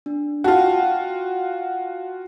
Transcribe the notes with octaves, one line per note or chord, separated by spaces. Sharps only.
D4
F4 F#4 F#5 G5 A5